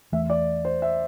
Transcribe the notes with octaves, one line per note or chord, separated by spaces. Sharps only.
E2 E3 A3 E5
D5
C5
E5